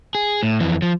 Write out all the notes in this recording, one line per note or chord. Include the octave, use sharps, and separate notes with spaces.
G#4
A2
F2 E3
F3